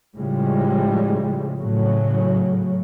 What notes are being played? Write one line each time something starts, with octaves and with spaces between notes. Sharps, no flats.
A2 C#3 F3 G3 G#3
A2 C#3 F#3